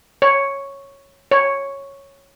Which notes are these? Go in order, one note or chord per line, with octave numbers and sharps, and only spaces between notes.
C#5
C#5